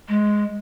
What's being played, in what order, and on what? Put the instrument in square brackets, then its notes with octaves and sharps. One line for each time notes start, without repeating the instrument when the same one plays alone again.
[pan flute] G#3